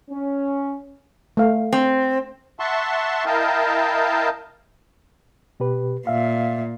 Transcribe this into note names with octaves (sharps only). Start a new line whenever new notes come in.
C#4
A3 F5
C4
E5 F#5 A5 C6 C#6
E4 A#4 D#5 F5 G5 A5
B2 G4 B4
A#2 E5 F5